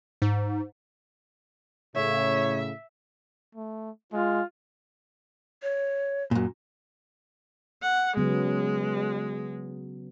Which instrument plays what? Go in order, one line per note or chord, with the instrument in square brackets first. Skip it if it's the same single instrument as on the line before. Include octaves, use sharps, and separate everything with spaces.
[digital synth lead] G#2
[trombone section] A2 C#3 [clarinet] C#5 [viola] E5
[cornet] A3
[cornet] G#3 [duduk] F4
[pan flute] C#5
[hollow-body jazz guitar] F#2 A#2
[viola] F#5
[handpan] C#3 F#3 B3 [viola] G#3